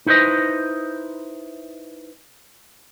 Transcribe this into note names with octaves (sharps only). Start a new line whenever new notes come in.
D#4 E4 B4 C5 D#5